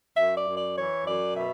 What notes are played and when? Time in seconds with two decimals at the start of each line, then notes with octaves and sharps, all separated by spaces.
0.17 F#2 E5
0.37 D5
0.47 F#2
0.56 D5
0.76 E3 C#5
1.05 F#2 D5
1.35 B2 E5